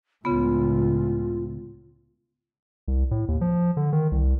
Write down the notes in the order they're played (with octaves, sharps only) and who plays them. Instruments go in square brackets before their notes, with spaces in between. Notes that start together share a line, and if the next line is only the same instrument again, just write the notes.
[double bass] C#2 A2 [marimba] C#3 B3 [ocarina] F4
[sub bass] C2
A2
D#2
F3
D3
D#3
C2